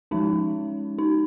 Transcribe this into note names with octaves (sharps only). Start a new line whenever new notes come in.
F3 G#3 C#4 D#4
D#4